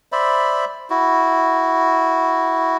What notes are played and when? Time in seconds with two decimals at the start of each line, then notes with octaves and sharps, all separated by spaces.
0.12 C5 D5 E5 B5
0.90 E4 F#4